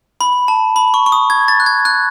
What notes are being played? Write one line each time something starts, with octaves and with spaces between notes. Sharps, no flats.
B5
A5
B5
C#6
C#6
D#6
G#6
A6
F#6
G#6
F#6